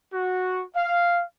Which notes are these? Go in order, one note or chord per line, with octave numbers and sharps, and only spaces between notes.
F#4
F5